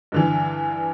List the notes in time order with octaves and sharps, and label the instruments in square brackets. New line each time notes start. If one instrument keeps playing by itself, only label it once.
[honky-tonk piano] G2 D3 E3